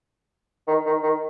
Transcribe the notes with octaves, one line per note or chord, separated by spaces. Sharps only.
D#3
D#3
D#3